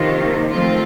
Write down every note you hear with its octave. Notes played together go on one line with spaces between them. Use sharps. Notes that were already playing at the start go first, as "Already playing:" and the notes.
Already playing: C3 D#3 F3 A#3 F4
D#3 F3 A3 C4 F4